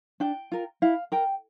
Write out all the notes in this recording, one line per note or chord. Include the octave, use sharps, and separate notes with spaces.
D4 G5
F4 A#4
E4 F5
A#4 G5